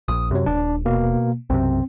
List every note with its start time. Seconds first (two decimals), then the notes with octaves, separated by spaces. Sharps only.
0.08 A#1 D#6
0.31 F#2 C3 F#3
0.46 D#1 D4
0.85 B2 A#3
1.50 B1 F#2 C3 C4